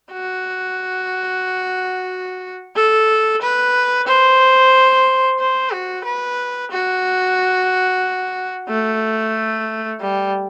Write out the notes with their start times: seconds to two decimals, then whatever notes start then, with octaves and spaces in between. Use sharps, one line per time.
0.13 F#4
2.76 A4
3.42 B4
4.07 C5
5.39 C5
5.72 F#4
6.05 B4
6.72 F#4
8.69 A3
10.01 G3